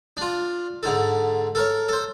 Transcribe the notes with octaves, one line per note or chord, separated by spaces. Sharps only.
D4 F4
G#2 D3 A4
A4 A#4 C#5
A4 C5